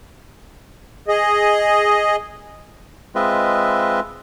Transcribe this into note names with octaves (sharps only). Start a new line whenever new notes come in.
G#4 D#5
G#3 C4 F4 B4 D#5 E5